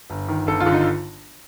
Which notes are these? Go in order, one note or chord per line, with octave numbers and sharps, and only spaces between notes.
G1
D#3
G1 A4
F4
D3
D#4